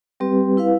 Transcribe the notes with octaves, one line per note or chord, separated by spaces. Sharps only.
G3 C4 G4 B4
E4 B4 F5